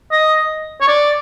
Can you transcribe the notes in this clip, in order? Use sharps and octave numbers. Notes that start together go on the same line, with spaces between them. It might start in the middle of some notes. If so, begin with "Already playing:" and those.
D#5
C#5
D5